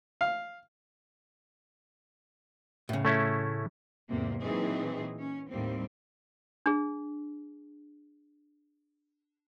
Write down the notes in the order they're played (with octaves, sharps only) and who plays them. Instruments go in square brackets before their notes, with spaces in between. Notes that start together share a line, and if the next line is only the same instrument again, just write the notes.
[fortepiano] F5
[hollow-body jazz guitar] A2 C#3
[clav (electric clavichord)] A3 C#4 E4
[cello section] E2 G#2 C3 A#3
A#2 E3 F#3 C4 D#4 G#4
C#4
D#2 A2 G3 A#3 C4
[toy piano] D4 G#4